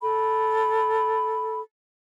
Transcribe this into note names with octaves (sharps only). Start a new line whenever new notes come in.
A4 B5